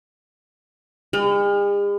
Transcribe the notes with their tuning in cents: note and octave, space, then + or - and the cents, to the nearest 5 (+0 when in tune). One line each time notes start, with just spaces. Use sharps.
G#3 -45